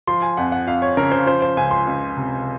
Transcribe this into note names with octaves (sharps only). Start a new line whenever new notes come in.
F3 C6
G#5
F2 F#5
F#5
F2 F5
C#5
C#3 A#4
C5
F3 C5
C5
C#2 G#5
C6
C#2
C3